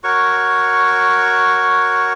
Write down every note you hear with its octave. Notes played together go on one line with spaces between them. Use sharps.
F#4 A#4 C#5 C#6